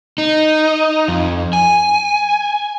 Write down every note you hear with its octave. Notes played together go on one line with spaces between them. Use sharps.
D#4
F2
G#5